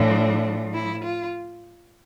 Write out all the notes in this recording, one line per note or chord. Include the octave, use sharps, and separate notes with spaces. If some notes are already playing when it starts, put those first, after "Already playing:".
Already playing: A2 F3 D4
E4
F4